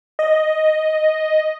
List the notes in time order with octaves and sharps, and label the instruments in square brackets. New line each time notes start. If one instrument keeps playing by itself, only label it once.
[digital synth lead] D#5